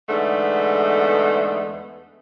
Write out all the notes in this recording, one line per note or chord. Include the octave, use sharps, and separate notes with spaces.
E2 G#2 D3 A3 B3